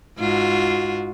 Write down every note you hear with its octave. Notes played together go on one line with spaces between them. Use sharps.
G#2 F4 F#4